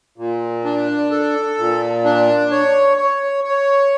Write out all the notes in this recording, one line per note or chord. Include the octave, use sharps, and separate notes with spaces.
A#2
D4
A4
A#2
D4
C#5
C#5
C#5